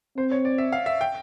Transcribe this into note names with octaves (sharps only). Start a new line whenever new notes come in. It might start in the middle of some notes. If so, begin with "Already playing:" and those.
C4 C5
C#5
D5
E5
F5
E5
G5